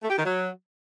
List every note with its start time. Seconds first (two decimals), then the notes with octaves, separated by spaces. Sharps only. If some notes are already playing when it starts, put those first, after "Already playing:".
0.02 A3
0.09 G4
0.17 D#3
0.24 F#3